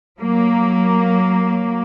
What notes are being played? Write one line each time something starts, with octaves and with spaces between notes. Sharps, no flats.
F#3 A#3